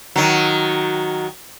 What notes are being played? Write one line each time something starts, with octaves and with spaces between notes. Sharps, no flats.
D#3 F#3